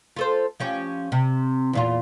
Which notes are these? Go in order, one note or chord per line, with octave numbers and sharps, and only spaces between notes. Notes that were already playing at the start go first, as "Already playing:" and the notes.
F4 A4 C5
F3 C#4 G4
C3
E2 A#2 F4